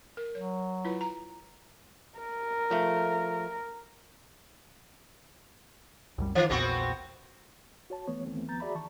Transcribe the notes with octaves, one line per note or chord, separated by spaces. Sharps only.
A#4
F#3 C#5
E4 F4 B4
A#5
A#4
F3 A3
C2 F#2 G3
D#3 E3
A#1 E2 A#2 B3 C4 F#4
F#4 C#5 A5
E3 A3 B3 C#5
D2 D#3 E3 A3 B3 C4
D#2 F3 B3 A#5 G6 A6
F#4 G#4 D5 E5 A#5 B5
D2 D#3 E3 A5 C#6